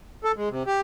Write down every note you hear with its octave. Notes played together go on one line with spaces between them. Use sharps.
A4
G#3
C3
G4